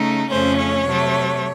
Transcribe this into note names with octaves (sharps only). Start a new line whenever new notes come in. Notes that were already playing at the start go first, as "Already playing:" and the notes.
Already playing: C#3 A3 D#4
F2 C#3 A3 C#4 C5
C#5
C3 F#3 A3